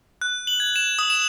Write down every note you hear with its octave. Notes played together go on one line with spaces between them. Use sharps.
F#6
F#7
G#6
E7
D#6
E7